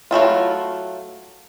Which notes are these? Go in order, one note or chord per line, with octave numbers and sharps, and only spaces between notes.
F#3 A3 E4 F4